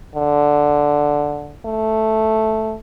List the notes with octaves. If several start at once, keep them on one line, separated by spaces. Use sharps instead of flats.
D3
A3